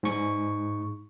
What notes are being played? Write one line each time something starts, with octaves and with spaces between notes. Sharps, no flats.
G#2 C#6